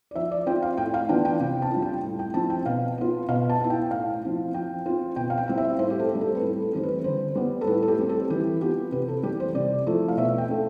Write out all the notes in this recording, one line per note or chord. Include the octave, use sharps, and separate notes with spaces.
D5
F3 E5
D5
C4 F4 G5
F5
A2 G5
F5
E3 B3 D4 F4 G5
G5
C3 G5
A5
G3 D4 F4
G5
A2
G5
F3 C4 E4 A5
G5
B2 F5
B3 F4
B2 F5
A5
B3 E4
G5
A2 F5
F3 C4 E4
F3 G5
C4 F4
B2 G5
F5
G5
G3 C4 E4
E5
A2 C5
G4
A4
G3 C4
A4
B4
A2 A4
A4
E3 G3 C4 E4 C5
B4
D3 C5
G3 B3
A4
A2 B4
A4
G4
G3 C4
A4
E3 G4
B3 F4 G4
C3 B4
A4
E3 G3 G4
C5
C3 D5
F3 A3 E4
F5
B2 E5
G5
A3 C4